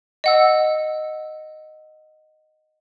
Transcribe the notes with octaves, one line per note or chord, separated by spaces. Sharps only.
D#5 F#5 E6